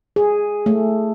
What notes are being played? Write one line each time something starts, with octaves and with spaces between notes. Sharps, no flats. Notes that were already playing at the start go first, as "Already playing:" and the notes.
G#4
A3